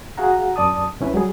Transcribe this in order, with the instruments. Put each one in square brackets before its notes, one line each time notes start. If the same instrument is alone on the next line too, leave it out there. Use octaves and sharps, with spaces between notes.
[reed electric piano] F#4 G#4 F5 F#5 A#5
F#2 D5 A5 D#6
C2 C#4 E4 B4
F#3 G3 G#4